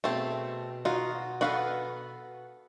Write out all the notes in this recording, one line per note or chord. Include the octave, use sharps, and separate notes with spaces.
B2 A3 C4 G#4 A5
D#4 F4 F#4
B3 F#4 A4 B4 F5 B5